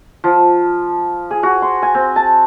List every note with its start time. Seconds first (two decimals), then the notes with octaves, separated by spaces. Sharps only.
0.24 F3
1.31 G#4
1.43 F#4
1.62 C6
1.82 G#5
1.94 C4
2.16 A5